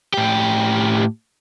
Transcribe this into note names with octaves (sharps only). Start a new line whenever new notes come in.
A2 G4